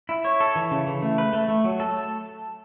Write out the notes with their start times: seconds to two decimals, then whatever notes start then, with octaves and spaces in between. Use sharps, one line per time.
0.09 E4
0.25 C#5
0.40 A4
0.56 E3
0.71 C#3
0.87 E3
1.02 A3
1.18 B4
1.33 A3
1.48 A3
1.64 F#3
1.80 A4